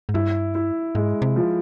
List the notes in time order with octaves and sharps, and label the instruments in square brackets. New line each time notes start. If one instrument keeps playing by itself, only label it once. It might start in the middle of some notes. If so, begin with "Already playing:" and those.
[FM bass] G#2
[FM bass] G2 [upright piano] E4
[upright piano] E4
[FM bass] G#2 [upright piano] G#3
[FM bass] C3
[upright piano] F3